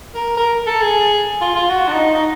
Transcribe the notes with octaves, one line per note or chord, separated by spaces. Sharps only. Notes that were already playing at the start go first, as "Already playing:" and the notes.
A#4
A#4
A4
G#4
F4
F4
F#4
D4
D#4
D#4